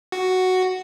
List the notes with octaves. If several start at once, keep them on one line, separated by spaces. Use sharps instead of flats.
F#4